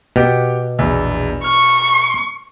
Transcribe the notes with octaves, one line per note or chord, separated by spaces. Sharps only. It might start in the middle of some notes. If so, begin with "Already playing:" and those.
B2 G4 F#5 G5
A#1 E2
C#6 F6